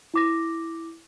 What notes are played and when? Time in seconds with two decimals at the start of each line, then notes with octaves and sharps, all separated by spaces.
0.14 E4 D6 A#6